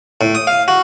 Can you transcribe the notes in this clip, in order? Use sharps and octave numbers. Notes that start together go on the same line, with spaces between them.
A2
D#6
F5
F#4